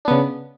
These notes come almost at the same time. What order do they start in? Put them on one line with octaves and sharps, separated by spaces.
D4 B3 C#3